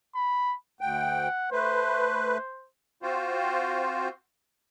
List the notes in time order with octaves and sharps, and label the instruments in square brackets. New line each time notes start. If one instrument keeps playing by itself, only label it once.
[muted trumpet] B5
[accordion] D2 G5 [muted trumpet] F#5
[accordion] A3 B4 [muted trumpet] C5
[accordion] C4 F4 F#4 C5